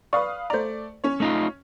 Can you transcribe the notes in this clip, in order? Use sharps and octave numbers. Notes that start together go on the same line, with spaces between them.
B4 D5 F5 C#6 D#6
A3 C5 D5 A#5
C#4 C#5
A3 D#4 F4